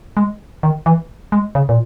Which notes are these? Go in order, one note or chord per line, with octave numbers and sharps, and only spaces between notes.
G#3
D#3
E3
G#3
C#3
A#2